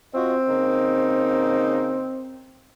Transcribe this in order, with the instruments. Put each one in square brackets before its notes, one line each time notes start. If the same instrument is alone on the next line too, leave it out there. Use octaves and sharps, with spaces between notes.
[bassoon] C4 [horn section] F4 F#4 D#5
[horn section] C#3 A#3 D#4